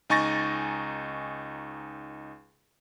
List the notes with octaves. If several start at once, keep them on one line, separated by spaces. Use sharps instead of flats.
C#2 D#4 G#5 C#6 A6 A#6